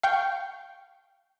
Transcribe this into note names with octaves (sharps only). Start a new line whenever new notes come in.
F5 G5 C#6 G6